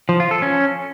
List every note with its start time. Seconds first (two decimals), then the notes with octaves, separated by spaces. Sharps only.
0.09 F3
0.20 F4
0.31 A4
0.42 C#4